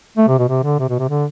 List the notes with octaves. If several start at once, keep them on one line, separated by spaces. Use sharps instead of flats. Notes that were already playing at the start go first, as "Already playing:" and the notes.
A3
C3
B2
C3
D3
C3
B2
C3
D3